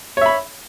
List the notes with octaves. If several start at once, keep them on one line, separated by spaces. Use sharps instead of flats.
C#5 E5 B5